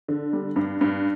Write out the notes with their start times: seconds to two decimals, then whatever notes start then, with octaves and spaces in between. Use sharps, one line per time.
0.08 D3
0.33 G3
0.56 G2
0.81 G2